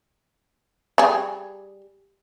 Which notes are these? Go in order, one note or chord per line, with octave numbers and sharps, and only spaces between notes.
G3 G#4